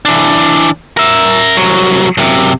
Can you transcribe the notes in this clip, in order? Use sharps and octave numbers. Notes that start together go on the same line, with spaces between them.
E3 D4
A#4 E5
C2 F#3
F#2 C3